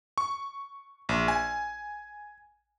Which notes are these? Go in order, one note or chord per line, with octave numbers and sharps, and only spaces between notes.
C#6
A#1
G#5